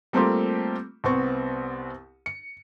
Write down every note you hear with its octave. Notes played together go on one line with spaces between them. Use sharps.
G3 A3 A#3 C4 F4 G4
C2 B3 C4 C#6
C#7